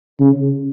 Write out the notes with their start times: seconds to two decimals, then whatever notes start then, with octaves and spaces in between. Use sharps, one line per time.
0.20 C#3